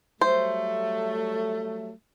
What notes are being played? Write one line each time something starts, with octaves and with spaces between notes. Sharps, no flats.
F#3 G3 A3 C5